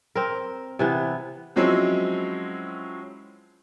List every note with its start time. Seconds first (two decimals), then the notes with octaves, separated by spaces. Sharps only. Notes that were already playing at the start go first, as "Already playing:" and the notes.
0.15 C4 A#4
0.79 C3 E3 B3
1.56 F3 F#3 G#3 C4 C#4 E4